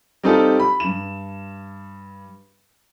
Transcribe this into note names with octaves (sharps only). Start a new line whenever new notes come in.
G3 C4 D#4 F4 G4 A4
B5
G2 E7